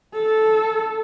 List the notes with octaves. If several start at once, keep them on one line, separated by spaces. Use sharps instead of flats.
A4